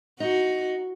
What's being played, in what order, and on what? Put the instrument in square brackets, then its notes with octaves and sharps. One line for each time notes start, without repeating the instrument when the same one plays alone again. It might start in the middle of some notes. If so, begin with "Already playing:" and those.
[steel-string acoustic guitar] D#4 [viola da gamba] F#4